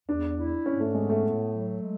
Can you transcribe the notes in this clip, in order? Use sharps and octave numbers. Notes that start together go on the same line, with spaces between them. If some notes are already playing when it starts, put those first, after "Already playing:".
E2 D4
E4
G#2 C#4
A3
G#3 B3
A3
A2
F#3
G#3